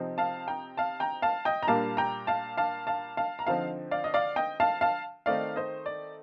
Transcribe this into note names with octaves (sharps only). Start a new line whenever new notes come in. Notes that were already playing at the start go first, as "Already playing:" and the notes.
Already playing: C3 F3 C4 D#4
F5 A5
G5 A#5
F5 A5
G5 A#5
F5 A5
D#5 G5
A#5
A#2 G3 A#3 D4 F5 A5
G5 A#5
F5 A5
F5 A5
F5 A5
F5 A5
A#5
D3 F3 C4 D#4 F5 A5
D5 F5
D#5
D5 F5
D#5 G5
F5 A5
F5 A5
D#3 A3 C4 D#4 D5 F5
C5 D#5
D5